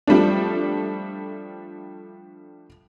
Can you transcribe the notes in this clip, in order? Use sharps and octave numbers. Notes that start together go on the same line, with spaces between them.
F3 G3 A3 D4